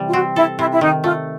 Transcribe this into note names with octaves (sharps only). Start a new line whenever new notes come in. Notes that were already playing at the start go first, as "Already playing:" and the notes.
Already playing: C3 E3 G3
F4
C4 F#4
E4 A4
C3 E4
E4
D#3 D#4
A3 F4